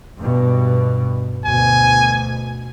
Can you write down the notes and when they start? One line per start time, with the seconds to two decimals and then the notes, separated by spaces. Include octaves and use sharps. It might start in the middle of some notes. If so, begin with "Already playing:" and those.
0.18 G2 B2
1.45 D2 B2 G#5